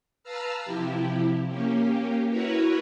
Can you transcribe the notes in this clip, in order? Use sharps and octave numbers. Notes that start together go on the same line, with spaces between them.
B4 F5 A5 A#5 E6 F6
C3 F3 E4 G4
A#3 C#4 G4
E4 F#4 A#4 B4 C#5